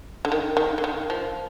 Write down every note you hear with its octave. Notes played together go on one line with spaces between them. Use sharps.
D3
D#3
D#3
D3
D#3
F3